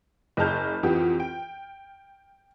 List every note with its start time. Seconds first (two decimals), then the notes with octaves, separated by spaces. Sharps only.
0.37 F#1 G#4 D#5 A5 F6 G6
0.83 F2 E3 F3 G4 F#5
1.20 G5